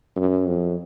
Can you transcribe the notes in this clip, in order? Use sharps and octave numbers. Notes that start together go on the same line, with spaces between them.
F#2
F2